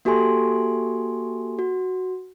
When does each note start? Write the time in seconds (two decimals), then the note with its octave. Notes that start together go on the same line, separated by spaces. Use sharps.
0.05 A#3 F#4 G4 A4 G#5 C6
1.59 F#4